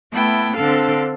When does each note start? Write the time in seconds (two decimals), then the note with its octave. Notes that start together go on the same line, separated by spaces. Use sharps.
0.13 A3 B3 E4 G5 A5
0.55 D3 C4 D4 A4 F5 A5